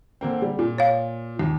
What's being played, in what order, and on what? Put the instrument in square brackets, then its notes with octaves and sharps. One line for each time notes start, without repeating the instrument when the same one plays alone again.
[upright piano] D3 A#3 C4
G3
A#2
[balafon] C#5 F5
[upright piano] D#2